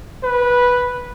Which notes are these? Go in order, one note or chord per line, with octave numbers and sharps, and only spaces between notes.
B4